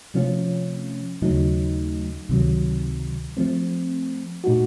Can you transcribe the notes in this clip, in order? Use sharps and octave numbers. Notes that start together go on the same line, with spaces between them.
C3 F3 A3 C#4 F4
D#2 C#3 F#3 A3 D#4
C#2 C3 D#3 F#3
F3 A3 C4
A#2 A3 D#4 F#4